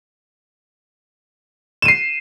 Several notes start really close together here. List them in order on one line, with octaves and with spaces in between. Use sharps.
E7 D#7 C7